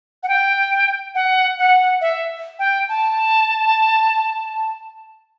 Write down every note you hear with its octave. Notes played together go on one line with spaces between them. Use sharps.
F#5
G5
F#5
F#5
E5
G5
A5